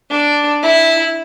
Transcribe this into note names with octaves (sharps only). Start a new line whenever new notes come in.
D4
E4